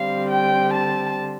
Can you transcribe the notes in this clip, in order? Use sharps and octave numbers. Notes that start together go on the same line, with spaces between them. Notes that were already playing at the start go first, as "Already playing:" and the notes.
Already playing: D3 G3 C4 F5
G5
A5